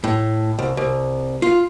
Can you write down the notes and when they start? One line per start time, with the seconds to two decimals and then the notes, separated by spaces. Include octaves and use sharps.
0.04 A2
0.59 C2
0.77 C2
1.42 F4